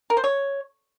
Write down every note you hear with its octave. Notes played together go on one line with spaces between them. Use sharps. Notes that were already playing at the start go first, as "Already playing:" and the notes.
A#4
C5
C#5